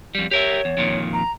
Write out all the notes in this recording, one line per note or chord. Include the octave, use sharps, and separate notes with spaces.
F2 G3
G4 A#4 C#5 E5
E2
F2 A#2 D#3
A#5